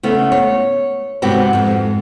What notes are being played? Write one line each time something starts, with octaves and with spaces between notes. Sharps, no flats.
C#3 A3 B3 C#4
C#5
G#2 C3 B3 F#4 G4 B4
F2 G#2